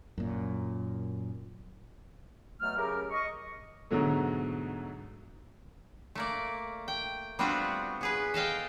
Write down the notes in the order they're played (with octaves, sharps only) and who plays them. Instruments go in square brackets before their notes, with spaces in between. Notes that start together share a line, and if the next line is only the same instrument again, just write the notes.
[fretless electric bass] F#2 A#2
[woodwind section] B2 F#3 A3 F6
C#3 F#3 G4 A#4
D#5 C#6
[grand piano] G#2 B2 D3 F#3 A3
[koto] A3 A#3 D5
G5
G3 B3 C4 D4 F4 F#4
B3 G#4 B4
A4 D#5 F5 G5